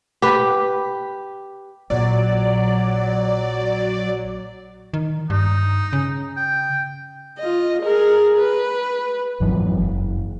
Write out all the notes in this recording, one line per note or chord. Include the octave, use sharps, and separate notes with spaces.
G4 B4
A#1 F#3 D5
D#3
G2 D#4
C#3
G5
F4 D#5
G#4 A#4
B4
G#1 F2 E3 F#3
F#1